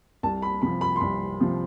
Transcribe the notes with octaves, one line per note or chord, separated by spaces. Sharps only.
C2 A5
B5
C3 F3 B5
B5
C6
C2 B5
C3 F3